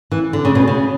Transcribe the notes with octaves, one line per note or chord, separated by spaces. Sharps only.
E3
D3
C#3
B2
C#3